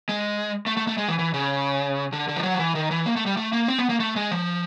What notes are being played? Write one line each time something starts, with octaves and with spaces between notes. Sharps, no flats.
G#3
A3
A3
A3
G#3
E3
E3
C#3
D3
D3
F3
F#3
F3
E3
D#3
E3
A#3
A3
G3
A3
A#3
C4
B3
A#3
A3
G#3
F3